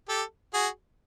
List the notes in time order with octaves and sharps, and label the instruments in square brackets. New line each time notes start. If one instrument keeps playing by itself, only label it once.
[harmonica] G4 A4
F#4 G#4